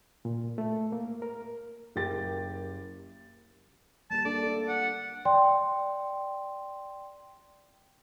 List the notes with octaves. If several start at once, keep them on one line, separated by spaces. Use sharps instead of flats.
A#2
A3
A#3
A#4
F#1 G4 A#4 G5 A6
G3 A#3 G4 A5
A#3 D4 A4 D5
D4 A4
F#5
D5 G5 C6